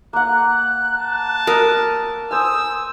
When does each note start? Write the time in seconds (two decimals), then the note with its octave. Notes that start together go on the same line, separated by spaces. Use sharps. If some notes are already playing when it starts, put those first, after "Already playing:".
0.13 A#3 F#5 F#6
0.96 A5
1.47 A#4 D#6 E6
2.31 C5 G#5 D#6 E6